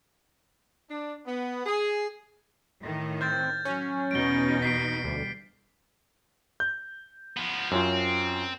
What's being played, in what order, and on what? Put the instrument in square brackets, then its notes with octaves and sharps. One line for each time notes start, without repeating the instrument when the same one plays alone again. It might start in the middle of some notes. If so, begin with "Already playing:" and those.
[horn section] D4
B3
G#4
[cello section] A2 D#3
[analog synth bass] C4 [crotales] F6 G6 A6
[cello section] F#3 [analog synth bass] C#4
[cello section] E2 B2 D#4 [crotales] D7 G7
[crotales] B6 C7 D7
[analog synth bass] D2 [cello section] G3
[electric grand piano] G6
[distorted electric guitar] F3 B3
[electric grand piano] F#2 C#4 F4 [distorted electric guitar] C4